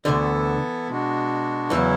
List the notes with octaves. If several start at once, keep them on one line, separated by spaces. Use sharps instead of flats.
D2 D3 E3 B3 E4 A4
B2 G#3 D4 F#4
E2 C#3 E3 F#3 C#4 E4